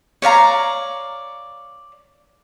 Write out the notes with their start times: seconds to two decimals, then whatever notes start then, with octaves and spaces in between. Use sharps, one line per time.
0.22 C#5 D5 F5 A#5